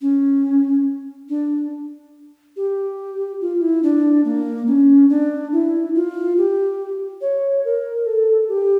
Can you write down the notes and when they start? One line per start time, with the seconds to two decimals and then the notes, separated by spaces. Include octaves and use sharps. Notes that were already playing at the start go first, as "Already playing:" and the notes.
0.01 C#4
1.29 D4
2.56 G4
3.41 F4
3.61 E4
3.83 D4
4.25 A#3
4.67 C#4
5.09 D4
5.52 E4
5.95 F4
6.38 G4
7.21 C#5
7.65 A#4
8.06 A4
8.48 G4